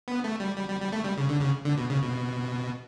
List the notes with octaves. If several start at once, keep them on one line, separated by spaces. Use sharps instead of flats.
B3
A3
G3
G3
G3
G3
A3
G3
C#3
D3
C#3
D3
B2
C#3
B2